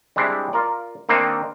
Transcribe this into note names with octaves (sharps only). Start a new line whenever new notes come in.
G3 G#3 C4 D4 E4
F4 A#4 D5
D#3 A#3 C4 D4 D#4